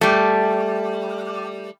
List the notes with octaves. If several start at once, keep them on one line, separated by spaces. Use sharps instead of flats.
G3 A3